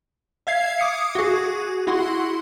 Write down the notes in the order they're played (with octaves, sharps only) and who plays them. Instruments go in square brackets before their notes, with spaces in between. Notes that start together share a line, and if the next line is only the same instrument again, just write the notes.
[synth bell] E5 F5 G#6 C7
D6 D#6 C#7
F#4 G#4
E4 F#4 F#5 C6